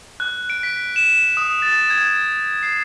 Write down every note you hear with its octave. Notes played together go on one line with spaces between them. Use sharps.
F#6
D7
B6
E7
D#6
A6
G#6
C7